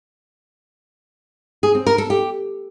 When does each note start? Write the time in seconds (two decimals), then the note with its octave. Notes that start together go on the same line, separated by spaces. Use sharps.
1.63 G#4
1.75 C4
1.87 A#4
1.98 A4
2.10 G4